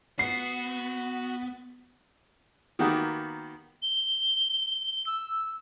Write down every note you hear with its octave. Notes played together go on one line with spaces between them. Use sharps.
B3 F#4 C7
D#3 A#3 B3 F#4 G4
G7
E6